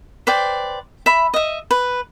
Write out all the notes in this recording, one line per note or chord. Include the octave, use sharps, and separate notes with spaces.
B4 C5 D5 G5
E5 B5
D#5 E5
B4